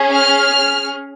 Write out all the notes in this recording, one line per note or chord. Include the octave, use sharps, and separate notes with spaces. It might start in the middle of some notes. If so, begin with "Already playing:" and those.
Already playing: C#4 G#4
F6